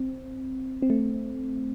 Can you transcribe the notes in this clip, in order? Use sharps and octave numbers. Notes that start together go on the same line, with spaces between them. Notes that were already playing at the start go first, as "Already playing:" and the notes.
Already playing: C4
C4
A3